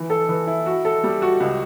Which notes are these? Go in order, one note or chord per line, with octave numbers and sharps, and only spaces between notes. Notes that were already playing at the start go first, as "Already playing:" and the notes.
Already playing: E3
A4
E3
E4
F#4
A4
G3
F#4
C#2